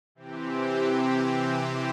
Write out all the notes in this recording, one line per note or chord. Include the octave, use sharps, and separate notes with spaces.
C3 E3 C4 G4